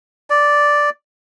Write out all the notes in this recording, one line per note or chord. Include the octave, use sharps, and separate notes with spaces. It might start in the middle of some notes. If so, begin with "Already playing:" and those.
D5